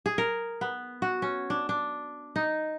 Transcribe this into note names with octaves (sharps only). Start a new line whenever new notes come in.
G#4
A#4
B3
F#4
C#4
D4
D4
D#4